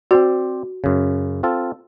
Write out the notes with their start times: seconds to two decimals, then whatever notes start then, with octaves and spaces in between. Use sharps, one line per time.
0.11 C4 F#4 C5 D5
0.84 F#2 C#3
1.43 C4 F4 A4